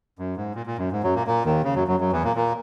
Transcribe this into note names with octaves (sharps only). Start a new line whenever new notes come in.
F#2
G#2
A#2
A#2
F#2
G#2
F#2 F#3
A#2 A#3
A#2 A#3
D#2 D#3
C#3
F#2 F#3
F#2 F#3
F#2 F#3
E2 E3
A#2 A#3
A#2 A#3